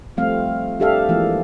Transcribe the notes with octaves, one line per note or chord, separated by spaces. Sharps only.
F3 G3 A3 C4 F5
D4 G4 A4 E5 F5
E3 F3 G#3 A#3 F4